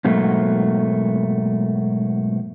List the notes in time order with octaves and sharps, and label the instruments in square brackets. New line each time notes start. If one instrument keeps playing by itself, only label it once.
[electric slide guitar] G#2 B2 F#3 A3 A#3